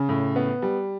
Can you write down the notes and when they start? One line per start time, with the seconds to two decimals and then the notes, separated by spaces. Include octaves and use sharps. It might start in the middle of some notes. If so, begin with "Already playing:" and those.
Already playing: C#3
0.09 A2
0.36 B3
0.62 G3